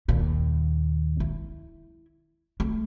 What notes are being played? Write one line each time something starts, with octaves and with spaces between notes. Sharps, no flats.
D#2 A#2
E4
A3